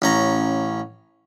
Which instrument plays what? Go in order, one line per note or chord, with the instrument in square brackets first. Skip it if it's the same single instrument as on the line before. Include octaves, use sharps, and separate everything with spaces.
[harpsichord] A1 C#4 A#5